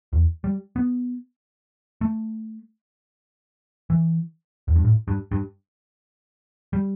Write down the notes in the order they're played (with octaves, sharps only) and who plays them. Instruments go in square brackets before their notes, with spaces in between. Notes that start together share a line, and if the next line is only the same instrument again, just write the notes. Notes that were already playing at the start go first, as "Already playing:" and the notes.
[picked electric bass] E2
G3
B3
A3
E3
E2
G2
A2
G2
G2
G3